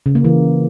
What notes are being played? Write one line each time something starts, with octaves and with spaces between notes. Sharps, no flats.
C#3
A#3
E3